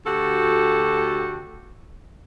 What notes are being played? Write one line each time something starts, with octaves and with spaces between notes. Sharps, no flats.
D2 F#4 G4 A4